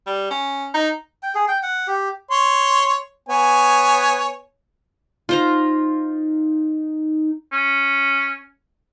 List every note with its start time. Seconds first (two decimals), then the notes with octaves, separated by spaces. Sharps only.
0.07 G3
0.31 C#4
0.74 D#4
1.23 G5
1.35 G#4
1.48 G5
1.63 F#5
1.88 G4
2.31 C#5 C6
3.29 B3 C#5 G#5
5.29 D#4 F4 C5 A#5
7.53 C#4